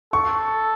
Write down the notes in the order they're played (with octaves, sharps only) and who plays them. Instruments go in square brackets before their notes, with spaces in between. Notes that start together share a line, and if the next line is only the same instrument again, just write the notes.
[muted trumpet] A4 [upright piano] C#6